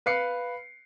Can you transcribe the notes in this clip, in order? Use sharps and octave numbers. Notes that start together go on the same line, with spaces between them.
B4 F5 C7 C#7